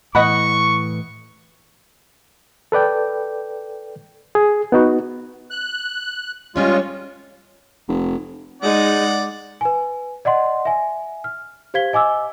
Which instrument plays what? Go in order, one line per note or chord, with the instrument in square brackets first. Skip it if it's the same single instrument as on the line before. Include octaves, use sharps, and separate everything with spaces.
[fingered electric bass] A2 E3 [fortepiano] D#5 F#5 B5 [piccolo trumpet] C#6
[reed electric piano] A4 B4 D5 G5
G#4
B3 D#4 F#4
[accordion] F#6
[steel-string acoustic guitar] G3 C#4 C#5 [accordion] G#3 F4
[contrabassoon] F1
[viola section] G#3 D#4 [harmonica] D5 F#5
[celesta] B4 G#5
D5 D#5 F#5 C6
E5 G#5
F6
G4 C5 F5 G#6 B6 G7
D#5 G#5 D6 E6